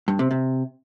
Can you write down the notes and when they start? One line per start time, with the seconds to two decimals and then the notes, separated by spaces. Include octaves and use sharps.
0.08 G2
0.19 C3
0.31 C3